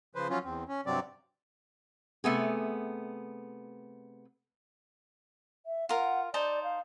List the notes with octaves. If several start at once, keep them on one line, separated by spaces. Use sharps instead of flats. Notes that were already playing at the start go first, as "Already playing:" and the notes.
C#3 F3 B4 C5
F3 F#3 C#4 F4
E2 C4
C#4
G2 C3 F#3 C4 D5
C3 A3 B3 G#4
E5
F4 A#4 F#5
D#4 C5 D5 A5
F5